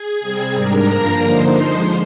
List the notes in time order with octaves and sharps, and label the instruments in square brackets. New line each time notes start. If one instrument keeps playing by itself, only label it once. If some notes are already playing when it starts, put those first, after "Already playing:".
Already playing: [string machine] G#4 G#5
C3 G3 C4
G#2 G3 D4 A#4 A#5
G2 F3 A#3 D4
D3 F3 A#3 D#4 C5 C6
D3 F3 G#3 D#4 C5 C6